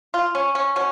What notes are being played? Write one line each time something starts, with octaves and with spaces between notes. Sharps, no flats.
F4
C#4
C#4
B2 C#4